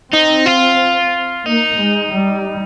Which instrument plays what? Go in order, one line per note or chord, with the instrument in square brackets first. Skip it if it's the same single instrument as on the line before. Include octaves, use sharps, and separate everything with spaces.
[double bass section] C4 [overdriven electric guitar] D#4
[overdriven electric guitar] F4
[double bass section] A#3 [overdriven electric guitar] D#4
[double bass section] G#3
G3